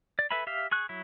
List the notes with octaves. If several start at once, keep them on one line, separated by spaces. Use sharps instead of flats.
D5
A4 B4 E5 G#5 B5
G4 E5 F5
G#4 C#6 F#6
F#3 E4